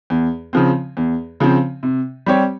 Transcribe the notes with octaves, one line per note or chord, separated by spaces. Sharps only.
E2
C#3 F3 C4
E2
C#3 F3 C4
C3
G3 C4 G4 C#5